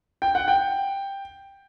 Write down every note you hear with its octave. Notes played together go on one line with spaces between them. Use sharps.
G5
F#5
G5